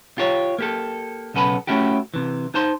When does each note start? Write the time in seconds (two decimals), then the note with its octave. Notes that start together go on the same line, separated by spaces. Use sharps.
0.18 F4 G4 C#5
0.59 A#3 G4 A4
1.34 B1 C#3 B3 A4 G#5 B5
1.67 A3 C#4 E4 F#4 G4
2.14 C3 E3
2.54 D#4 C5 A5 C6